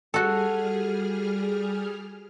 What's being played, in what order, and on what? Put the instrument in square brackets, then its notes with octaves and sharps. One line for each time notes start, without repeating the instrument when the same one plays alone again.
[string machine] G3 G#4 F6 [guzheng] F#4 A4